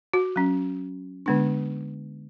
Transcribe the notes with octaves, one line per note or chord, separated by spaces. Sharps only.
F#4
F#3 C#4
D3 G#3 B3 D4